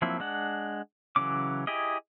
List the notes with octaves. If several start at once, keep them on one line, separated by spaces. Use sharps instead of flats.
F3 F#3 A#3 C4 E4
G#3 D4 F#5
C#3 E3 F#3 C#4 D6
E4 G4 G#4 D#5